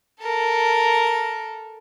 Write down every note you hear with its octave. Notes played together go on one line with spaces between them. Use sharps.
A4 A#4